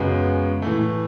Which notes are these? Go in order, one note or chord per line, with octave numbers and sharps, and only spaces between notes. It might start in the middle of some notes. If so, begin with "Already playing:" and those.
Already playing: F#2 C#3 G#3 B3 F#4
A2 E3 A3